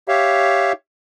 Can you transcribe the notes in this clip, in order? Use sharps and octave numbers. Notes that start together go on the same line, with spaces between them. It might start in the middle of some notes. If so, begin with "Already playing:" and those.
G4 C#5 E5 F5